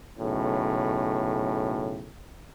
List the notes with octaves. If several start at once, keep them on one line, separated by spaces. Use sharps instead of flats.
B1 A2 C#3